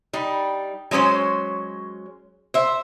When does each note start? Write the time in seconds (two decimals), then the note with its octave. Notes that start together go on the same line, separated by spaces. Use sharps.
0.13 G3 D#4
0.91 F#3 G#3 C#4 C5 C#5
2.54 C5 E5